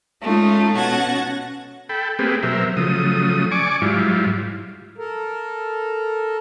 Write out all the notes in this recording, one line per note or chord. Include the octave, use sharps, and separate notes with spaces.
G#3 A3 C#4 D#4 F4
B2 C#4 F#5 A5 G#6 A#6
A4 G5 B5
A3 A#3 C4 G4 G#4 B4
B2 F#3 A#4 C5 E5
C#3 F3 F#3 A3 D#6
D5 G#5 C#6 D6
G#2 F#3 G3 E4 F4
A4 A#4